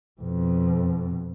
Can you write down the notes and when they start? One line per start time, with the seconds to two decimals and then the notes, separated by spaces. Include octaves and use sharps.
0.22 F2 B2